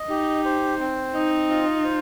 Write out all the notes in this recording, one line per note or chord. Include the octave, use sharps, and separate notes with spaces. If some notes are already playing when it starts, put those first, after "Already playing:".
Already playing: D#5
D#4 G4
C5
C4
D#4 D#5
F4
C5